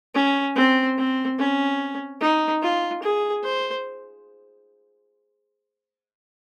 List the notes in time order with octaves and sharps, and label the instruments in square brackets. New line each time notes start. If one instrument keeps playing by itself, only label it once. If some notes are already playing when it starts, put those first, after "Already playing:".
[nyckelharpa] C#4
C4
C4
C#4
D#4
F4
G#4
C5